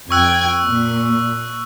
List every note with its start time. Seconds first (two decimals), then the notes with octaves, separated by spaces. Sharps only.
0.11 F2 G5 C#6 E6 F#6 G#6
0.65 A#2